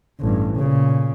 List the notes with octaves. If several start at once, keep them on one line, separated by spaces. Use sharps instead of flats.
A1 G2
A#2 C#3